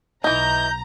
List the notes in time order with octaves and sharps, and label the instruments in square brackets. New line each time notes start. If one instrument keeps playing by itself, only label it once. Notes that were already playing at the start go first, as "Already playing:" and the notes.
[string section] B1 A#5 [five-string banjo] E3 D#4 [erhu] G6